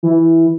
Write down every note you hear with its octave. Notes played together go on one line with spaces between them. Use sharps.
E3